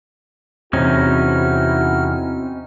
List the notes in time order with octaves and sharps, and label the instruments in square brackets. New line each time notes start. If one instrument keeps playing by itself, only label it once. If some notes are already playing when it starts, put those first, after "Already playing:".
[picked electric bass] E2 C3 [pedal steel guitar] C4 C#4 D#4 [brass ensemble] E4 F#4 [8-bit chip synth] F6